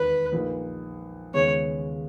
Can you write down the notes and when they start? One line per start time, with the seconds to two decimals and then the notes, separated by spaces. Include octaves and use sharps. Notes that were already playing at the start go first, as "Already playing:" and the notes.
Already playing: E1 D#2 D#3 B4
0.32 A#1 A#2 A#3 D#4
1.34 D#2 C#3 G#3 B3 C#5